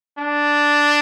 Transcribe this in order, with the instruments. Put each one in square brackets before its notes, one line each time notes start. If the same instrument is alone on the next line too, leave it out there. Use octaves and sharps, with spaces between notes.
[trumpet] D4